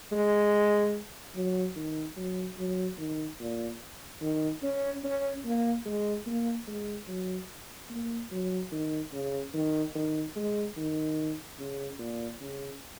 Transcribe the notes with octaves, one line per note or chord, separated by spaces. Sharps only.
G#3
F#3
D#3
F#3
F#3
D#3
A#2
D#3
C#4
C#4
A#3
G#3
A#3
G#3
F#3
A#3
F#3
D#3
C#3
D#3
D#3
G#3
D#3
C#3
A#2
C#3